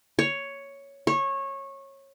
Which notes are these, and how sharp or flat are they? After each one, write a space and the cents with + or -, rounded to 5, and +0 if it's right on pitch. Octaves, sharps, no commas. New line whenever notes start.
C#5 +5
C#5 -20